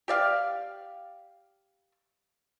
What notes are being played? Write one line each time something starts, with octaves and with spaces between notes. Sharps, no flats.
G4 D5 F5